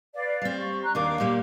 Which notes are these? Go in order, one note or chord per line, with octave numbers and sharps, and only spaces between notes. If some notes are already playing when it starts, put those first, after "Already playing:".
B4 D5 F5
G3 C4
C#6
A#5 F#6
D#2 D#3 D4 F5 D6
A#2 G3 A#3